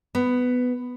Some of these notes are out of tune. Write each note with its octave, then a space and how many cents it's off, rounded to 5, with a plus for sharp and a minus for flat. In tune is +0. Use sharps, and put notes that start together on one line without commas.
B3 +10